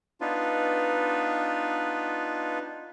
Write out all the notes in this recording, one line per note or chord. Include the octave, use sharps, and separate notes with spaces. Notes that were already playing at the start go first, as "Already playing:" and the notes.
B3 D4 D#4 F4 B4